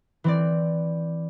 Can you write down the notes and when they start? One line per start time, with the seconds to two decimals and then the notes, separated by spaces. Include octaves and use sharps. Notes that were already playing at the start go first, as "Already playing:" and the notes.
0.24 E3 C4 D5